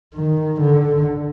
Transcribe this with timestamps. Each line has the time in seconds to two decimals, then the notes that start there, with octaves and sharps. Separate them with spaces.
0.15 D#3
0.61 D3